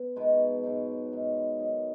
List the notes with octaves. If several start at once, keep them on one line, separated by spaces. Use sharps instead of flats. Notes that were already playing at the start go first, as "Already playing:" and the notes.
Already playing: B3
B2 G#3 D#4 B4
G#2 F#3 D#4
G#2 F#3 D#4
D#3 F#3 D#4